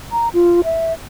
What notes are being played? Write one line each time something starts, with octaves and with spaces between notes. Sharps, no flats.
A#5
F4
E5